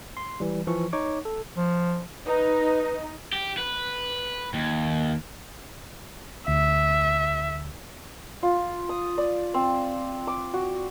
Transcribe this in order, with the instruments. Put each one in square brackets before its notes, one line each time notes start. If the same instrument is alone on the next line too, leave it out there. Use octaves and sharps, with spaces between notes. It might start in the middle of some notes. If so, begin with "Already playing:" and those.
[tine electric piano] C6
E3 G3
E3 F3 C#6
D#4 C#5 C#6 D6
A4
[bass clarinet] F3
[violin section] D#4 [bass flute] B4
[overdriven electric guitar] G4
B4
D#2
[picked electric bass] D2 [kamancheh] E5
[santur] F4
D#6
D5
C4
D6
F#4